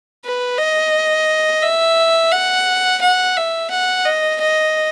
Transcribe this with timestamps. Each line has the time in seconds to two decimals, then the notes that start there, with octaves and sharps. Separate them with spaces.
0.25 B4
0.58 D#5
1.63 E5
2.32 F#5
3.01 F#5
3.37 E5
3.70 F#5
4.05 D#5
4.40 D#5